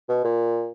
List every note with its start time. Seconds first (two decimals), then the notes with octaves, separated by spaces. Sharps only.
0.09 B2
0.24 A#2